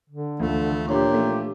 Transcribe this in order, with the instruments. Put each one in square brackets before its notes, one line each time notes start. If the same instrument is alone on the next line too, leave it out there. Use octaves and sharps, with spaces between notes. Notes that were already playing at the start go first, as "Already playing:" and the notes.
[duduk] D3
[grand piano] D2 F3 [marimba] E3 [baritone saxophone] A3
[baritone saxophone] A#2 [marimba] D4 C#5 [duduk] G4
[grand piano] F3 A3